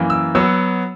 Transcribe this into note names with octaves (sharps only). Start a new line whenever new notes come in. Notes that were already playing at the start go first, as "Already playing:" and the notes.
Already playing: F#2 E3 A#3
E6
F#3 B3 E6